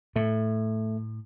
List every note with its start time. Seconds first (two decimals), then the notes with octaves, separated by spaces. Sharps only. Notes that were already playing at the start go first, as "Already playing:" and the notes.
0.16 A2 A3